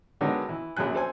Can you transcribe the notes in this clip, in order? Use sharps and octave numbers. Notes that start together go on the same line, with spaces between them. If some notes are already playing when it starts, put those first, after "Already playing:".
D3 D#3 F#3 G#3 B3 D#4
E3
A#1 F#2 F#3 G#5 F#6
A4 C5 G#5